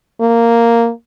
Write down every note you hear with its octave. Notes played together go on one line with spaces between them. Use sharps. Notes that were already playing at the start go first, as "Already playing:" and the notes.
A#3